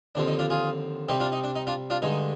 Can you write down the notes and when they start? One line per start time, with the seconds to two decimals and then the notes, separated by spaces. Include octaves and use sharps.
0.15 D#2 D3 F3 C4 D4
0.27 D#4
0.39 D4 F4
0.50 F4 G#4
1.09 C3 G3 C4 D#4 G4
1.20 D4 F4
1.32 D#4
1.44 D4
1.55 D#4
1.67 D4 F4
1.90 D4 F4
2.02 G2 D3 G#3 D#4